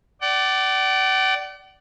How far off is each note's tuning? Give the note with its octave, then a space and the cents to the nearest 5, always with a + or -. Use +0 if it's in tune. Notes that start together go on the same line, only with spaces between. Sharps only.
D5 +0 F#5 +45